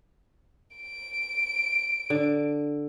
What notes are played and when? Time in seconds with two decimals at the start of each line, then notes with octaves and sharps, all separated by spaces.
0.77 D7
2.10 D3